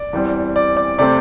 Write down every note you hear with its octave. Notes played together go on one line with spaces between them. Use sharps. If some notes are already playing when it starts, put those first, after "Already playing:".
Already playing: D5
E2 E3 G3 C4
D5 D6
D5 D6
C3 A3 C4 D5 D6